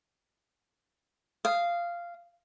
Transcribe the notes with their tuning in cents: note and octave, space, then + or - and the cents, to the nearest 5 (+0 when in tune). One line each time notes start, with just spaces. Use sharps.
F5 -10 D#6 +0